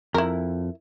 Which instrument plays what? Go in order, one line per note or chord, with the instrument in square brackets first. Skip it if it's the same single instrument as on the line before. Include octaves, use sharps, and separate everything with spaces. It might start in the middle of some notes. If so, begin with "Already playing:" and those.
[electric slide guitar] F2 [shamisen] E4 A#4